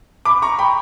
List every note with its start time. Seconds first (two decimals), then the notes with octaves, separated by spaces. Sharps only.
0.25 B5 D6
0.42 A#5 C#6
0.59 G5 B5